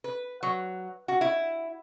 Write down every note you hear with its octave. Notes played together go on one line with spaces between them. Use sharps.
B4
F#3
F#4
E4